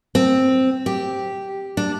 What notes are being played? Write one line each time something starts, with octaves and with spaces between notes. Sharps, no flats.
C4
G4
D4